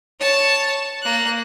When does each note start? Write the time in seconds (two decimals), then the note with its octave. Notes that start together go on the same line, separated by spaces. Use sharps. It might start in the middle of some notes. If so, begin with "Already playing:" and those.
0.20 C#5 A5
1.02 A#3 F#6